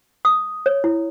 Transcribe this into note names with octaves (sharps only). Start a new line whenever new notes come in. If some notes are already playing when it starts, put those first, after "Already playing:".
D#6
C#5
E4